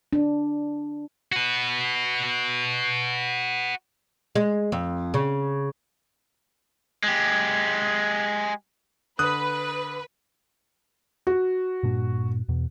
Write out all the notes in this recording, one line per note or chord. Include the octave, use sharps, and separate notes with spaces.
D4
F#4 B4
G#3
F2
C#3
G#3 G4
D3 B4 D#6 F#6
F#4
G2 A#2 D4
E2 B2